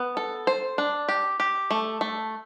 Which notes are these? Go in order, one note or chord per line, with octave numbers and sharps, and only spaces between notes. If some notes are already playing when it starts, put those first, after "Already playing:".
Already playing: B3
A4
C5
D4
G4
G4
A3
A3